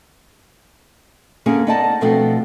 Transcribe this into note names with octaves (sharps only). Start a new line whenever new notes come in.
D3 A#3 B3 C#4 G#4
B3 D#4 D5 D#5 A5
B2 F3 A3 B3 C4 D4